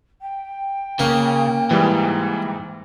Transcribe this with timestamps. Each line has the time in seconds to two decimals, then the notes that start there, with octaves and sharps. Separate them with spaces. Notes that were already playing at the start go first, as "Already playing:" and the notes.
0.21 G5
0.99 C#3 A#3
1.71 G#2 E3 G3